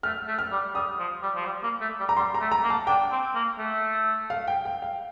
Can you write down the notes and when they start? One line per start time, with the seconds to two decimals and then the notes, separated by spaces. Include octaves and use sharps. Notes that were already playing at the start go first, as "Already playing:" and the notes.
0.03 A3 F6
0.28 A3
0.39 F6
0.51 G3
0.75 G3 D#6
0.99 F3
1.22 G3
1.35 F3
1.46 G3
1.63 A#3
1.81 A3
1.99 G3
2.09 A#5
2.17 G3 C6
2.34 A#5
2.41 A3
2.52 A#5
2.63 A#3
2.70 A5
2.87 D4 G5
3.11 C4
3.35 A#3
3.58 A3
4.30 F5
4.47 G5
4.65 G5
4.82 F5